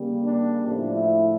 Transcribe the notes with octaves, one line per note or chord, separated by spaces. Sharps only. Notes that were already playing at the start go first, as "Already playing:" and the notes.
Already playing: C#3 G3 A#3
D4
A2 F3 A3 D4
E4